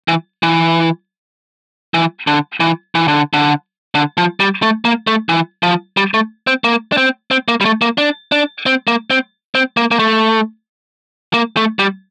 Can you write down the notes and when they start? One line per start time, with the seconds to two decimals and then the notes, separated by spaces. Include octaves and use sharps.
0.08 E3
0.43 E3
1.94 E3
2.27 D3
2.60 E3
2.95 E3
3.08 D3
3.33 D3
3.95 D3
4.18 F3
4.40 G3
4.62 A3
4.85 A#3
5.07 A3
5.29 E3
5.63 F3
5.97 G3
6.14 A3
6.47 C4
6.64 A#3
6.92 D4
6.97 C4
7.31 C4
7.48 A#3
7.61 G3
7.65 A3
7.82 A#3
7.98 D4
8.32 D4
8.66 C4
8.87 A#3
9.10 C4
9.55 C4
9.77 A#3
9.91 A#3
9.99 A3
11.34 A#3
11.57 A3
11.79 G3